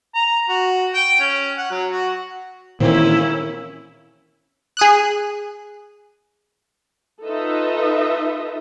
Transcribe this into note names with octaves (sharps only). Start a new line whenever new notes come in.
A#5
F#4
G5
C#4
F#5
F#3
F#4
A#2 D#3 E3 A#3 C4 C#4 E4
G#4 D#6 F#6
D#4 F4 A4 B4 D#5 E5